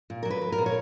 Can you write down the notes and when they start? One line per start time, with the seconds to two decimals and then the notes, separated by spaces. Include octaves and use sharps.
0.10 A#2
0.23 A#4
0.25 F#3
0.31 B4
0.42 F#3
0.52 A#4
0.58 A#2
0.66 C#5